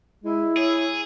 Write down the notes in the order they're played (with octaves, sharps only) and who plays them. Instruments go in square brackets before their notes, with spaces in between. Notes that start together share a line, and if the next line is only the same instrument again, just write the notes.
[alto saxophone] G#3 [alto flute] E4
[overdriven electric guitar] G#4 [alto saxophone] C#5